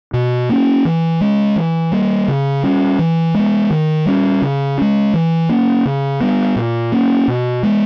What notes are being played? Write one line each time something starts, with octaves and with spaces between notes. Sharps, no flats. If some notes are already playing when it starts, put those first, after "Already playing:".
B2
A#3 C#4
E3
G#3 C#4
E3
G3 A#3
C#3
G3 C#4
E3
G#3 B3
D#3
G3 C#4
C#3
G#3 C#4
E3
A#3 C#4
C#3
G3 B3
A#2
A#3 C#4
B2
G#3 B3